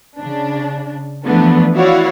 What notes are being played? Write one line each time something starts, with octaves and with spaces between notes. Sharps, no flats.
C#3 D4
E3 F3 A3 B3 D4
E4 F#4 C#5 D5 F5 F#5